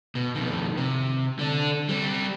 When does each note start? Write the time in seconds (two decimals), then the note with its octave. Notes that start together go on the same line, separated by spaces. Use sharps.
0.15 B2
0.35 F2 D#3
0.78 C3
1.39 D3 D4
1.89 G3 C4